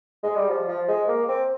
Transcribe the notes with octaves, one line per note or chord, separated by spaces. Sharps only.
G#3
G3
F3
F3
G#3
A#3
C4